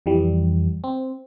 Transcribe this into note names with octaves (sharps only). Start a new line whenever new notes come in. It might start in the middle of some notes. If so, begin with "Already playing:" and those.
F2 E3 G3
C4